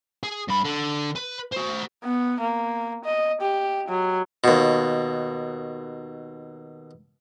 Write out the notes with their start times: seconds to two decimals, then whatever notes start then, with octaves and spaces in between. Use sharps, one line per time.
0.23 G#4
0.48 G2 B5
0.64 D3
1.16 B4
1.53 F#4 C5
2.04 B3
2.40 A#3
3.05 D#5
3.41 G4
3.89 F#3
4.44 D#2 B2